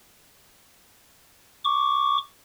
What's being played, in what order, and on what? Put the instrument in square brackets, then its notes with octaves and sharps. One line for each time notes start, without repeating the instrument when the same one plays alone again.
[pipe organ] C#6 D6